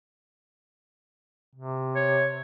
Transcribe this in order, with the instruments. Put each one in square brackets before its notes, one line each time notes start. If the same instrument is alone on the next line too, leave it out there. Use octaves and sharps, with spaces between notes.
[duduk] C3
[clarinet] C#5